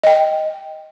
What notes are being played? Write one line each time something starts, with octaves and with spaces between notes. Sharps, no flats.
D#5 G5